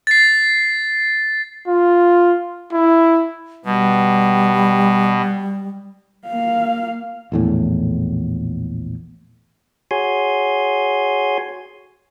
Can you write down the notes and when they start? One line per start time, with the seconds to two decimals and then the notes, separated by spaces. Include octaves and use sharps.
0.07 A6 C7
1.67 F4
2.73 E4
3.65 B2 G3
6.27 A#3 F5
7.32 A#1 E2 A2
9.91 F#4 G#4 C#5 G#5 C6